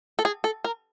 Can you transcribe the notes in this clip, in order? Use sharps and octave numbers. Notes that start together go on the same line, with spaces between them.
A4
G#4
A4
A#4